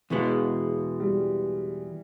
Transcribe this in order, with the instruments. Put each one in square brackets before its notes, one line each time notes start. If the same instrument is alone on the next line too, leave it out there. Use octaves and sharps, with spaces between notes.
[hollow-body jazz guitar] E2 B2 G#3 B3 [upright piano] E3
[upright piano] G3